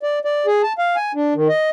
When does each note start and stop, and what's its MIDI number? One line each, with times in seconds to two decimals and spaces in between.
0.03 0.19 74
0.25 0.46 74
0.46 0.62 68
0.63 0.73 81
0.79 0.96 77
0.96 1.12 80
1.15 1.34 62
1.35 1.48 51
1.49 1.70 75